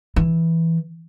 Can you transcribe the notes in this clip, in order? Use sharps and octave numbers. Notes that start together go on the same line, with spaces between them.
E3